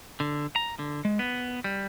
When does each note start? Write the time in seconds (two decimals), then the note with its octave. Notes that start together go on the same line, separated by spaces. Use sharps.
0.20 D3
0.56 A#5
0.79 D3
1.05 G#3
1.19 B3
1.64 G3